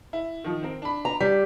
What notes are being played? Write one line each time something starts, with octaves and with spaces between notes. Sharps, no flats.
E4
D#3 F3
C4 A#4
D4 B5
A#5
G3 B6